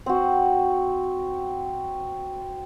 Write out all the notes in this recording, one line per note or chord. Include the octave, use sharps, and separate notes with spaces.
C4 F#4